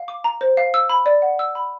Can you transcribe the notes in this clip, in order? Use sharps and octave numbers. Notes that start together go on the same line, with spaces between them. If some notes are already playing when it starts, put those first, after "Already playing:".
Already playing: F5
D6
A#5
C5
F5
E6
B5
D5
F#5
E6
B5